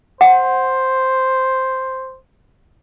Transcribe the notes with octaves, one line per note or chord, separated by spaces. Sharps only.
C5 F#5